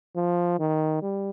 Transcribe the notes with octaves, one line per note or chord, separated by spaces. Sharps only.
F3
D#3
G3